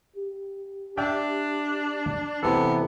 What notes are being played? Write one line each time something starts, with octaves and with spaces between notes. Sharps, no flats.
G4
D4 D5 E5 G5
C3 E3 B3 A4